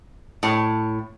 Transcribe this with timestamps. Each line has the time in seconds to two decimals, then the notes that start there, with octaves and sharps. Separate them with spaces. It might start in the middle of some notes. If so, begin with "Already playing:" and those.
0.43 A2 C#5